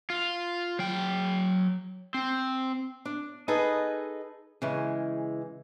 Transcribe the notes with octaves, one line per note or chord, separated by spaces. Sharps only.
F4
F#3 G5
C4
D4
D#4 G#4 A4 B4 D#5
C#3 E3 G#3